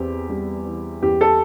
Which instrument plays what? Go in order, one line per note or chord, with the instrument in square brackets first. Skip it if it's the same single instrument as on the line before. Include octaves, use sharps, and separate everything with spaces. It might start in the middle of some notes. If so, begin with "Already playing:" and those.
Already playing: [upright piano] E2 C4 G4
G3
E3
E2 G4
A4